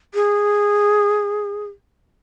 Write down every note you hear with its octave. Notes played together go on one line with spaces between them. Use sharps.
G#4